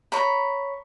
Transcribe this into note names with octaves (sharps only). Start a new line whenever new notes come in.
C#5 A#5 B5